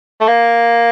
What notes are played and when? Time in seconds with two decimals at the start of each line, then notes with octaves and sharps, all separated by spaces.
0.21 A3
0.28 A#3